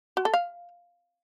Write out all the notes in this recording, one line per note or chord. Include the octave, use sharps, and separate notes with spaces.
F#4
A4
F5